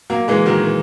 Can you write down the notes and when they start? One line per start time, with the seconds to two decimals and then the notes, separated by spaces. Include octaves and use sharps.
0.10 F#3 A#3
0.28 E3 G#3
0.46 D#3 F#3
0.64 E3